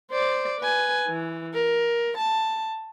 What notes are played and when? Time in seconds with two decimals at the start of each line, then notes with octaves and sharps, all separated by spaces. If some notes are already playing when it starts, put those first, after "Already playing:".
0.11 C5 D5
0.61 B4 G#5
1.08 E3
1.54 A#4
2.17 A5